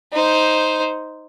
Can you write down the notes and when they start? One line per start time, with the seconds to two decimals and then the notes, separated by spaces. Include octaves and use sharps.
0.13 D#4 C5